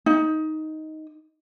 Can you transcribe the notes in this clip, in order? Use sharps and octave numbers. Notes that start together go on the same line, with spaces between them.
D#4